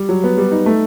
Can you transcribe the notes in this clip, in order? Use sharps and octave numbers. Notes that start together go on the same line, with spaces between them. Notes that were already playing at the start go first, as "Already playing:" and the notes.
Already playing: G3
F#3
B3
G3
D#4
A3